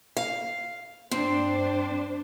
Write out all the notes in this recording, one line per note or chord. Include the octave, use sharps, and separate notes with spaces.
F5
G2 C4 D4 C5